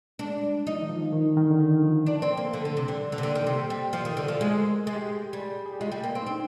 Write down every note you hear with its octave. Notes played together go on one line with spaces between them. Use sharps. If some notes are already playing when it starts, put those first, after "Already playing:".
G#3 D4
G3
F3 D#4
D#3
F3
D#3
D#3
D3
D#3
F3
D4
C4
A#3
D3
D3
C3
D3
G3
D3
C3
D3 A#3
D#3
C3 G4
G3
F3
D#3
D3
F3
G#3 G#4
A#4
G#3 G#4
G4
G#4
G3
G#4
G4
G#3 F4
G3
A#3
C4
D#4
C4 D4